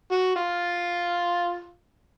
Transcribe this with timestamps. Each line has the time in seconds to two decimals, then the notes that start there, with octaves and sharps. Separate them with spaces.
0.11 F#4
0.36 F4